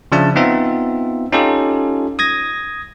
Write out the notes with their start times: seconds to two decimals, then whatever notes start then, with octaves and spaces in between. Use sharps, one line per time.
0.12 C#3 F3 D4 E5 A5
0.36 B3 C4 D#4 F4 E5
1.32 C#4 D#4 F4 G4 A4
2.19 D#6 G#6 A#6